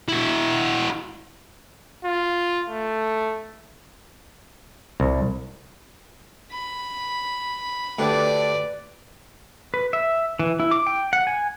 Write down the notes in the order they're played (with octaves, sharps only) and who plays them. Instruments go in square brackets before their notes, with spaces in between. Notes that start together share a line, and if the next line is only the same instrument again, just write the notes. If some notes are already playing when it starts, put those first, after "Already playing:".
[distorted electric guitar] E4 F#4
[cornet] F4
A3
[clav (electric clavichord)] C2
[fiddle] B5
[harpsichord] D2 D4 G4 [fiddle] B4 D5
[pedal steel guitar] B4
E5
E3
E4
D6
G5
F#5
G#5